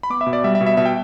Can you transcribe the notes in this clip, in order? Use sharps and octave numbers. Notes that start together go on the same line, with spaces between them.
B5
B3 D6
E5
B2
D5
G3 E5
E5
B2
E5
B2 E5
G5